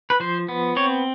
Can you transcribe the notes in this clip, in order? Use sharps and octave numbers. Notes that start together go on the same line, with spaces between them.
B4
F3 C5
B3
C4 C#5